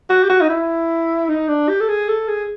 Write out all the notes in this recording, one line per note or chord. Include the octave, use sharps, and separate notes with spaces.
F#4
G4
F#4
D#4
E4
D#4
D4
G4
A4
G#4
A4
G#4